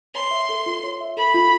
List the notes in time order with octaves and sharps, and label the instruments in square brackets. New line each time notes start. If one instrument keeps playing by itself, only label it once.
[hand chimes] C#5 [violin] C6
[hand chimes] E5
A4
F4
C#5
E5
[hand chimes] A4 [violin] B5
[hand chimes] F4